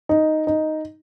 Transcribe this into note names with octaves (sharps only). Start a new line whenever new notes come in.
D#4
D#4